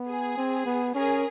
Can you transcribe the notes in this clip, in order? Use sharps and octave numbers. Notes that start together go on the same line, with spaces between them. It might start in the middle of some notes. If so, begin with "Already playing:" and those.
Already playing: B3
G#4
C4
B3
C#4 G#4 A#4